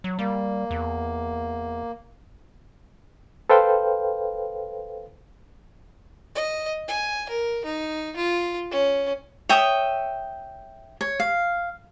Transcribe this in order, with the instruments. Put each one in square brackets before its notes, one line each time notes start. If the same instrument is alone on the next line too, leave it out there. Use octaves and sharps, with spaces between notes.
[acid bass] F#3
[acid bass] G3 [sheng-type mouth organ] A#3
[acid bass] E2
[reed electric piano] A4 B4 C5 F5 G5
[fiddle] D#5
G#5
A#4
D#4
F4
C#4
[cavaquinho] C#5 E5 G5 D#6
C#5
F5